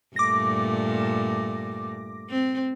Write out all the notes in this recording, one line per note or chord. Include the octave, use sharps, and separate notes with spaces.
G2 A#2 A3 D6 A#6
C4